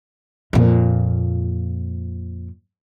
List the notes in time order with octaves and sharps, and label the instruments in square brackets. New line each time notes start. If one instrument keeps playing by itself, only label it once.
[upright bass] F2 A#2